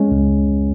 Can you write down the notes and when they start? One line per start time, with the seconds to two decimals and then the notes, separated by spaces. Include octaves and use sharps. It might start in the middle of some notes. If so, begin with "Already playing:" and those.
Already playing: G#3 C#4
0.11 C#2